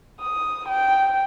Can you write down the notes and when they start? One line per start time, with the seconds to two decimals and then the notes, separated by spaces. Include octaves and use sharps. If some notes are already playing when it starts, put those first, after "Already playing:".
0.20 D#6
0.68 G5